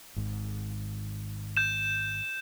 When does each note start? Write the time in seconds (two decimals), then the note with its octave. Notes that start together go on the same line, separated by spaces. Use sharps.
0.16 G#1 G#2
1.57 G6 E7